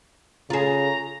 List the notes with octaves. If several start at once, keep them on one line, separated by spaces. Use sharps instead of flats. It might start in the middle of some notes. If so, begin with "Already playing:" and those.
C#3 F4 G#4 A#5